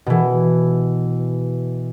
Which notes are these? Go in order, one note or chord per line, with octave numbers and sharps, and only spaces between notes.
B2 E3